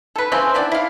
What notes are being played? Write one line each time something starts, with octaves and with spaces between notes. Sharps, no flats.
A4 B4
C#3 E3 C4
B3 D4 E4 D5
E4 F5